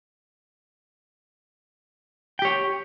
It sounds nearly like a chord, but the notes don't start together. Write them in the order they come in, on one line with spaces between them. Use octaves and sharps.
G5 G4 C#5